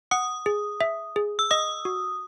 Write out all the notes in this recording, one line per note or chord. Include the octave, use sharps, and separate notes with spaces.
F#5 D#6
G#4
E5
G#4
E6
D#5 D#6
F#4